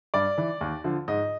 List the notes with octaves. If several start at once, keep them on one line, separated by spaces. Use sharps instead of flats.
G2 D5
E3
D#2
D3 F3
G#2 D#5